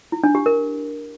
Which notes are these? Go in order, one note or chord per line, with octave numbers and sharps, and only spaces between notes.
E4
D4
G4
A#4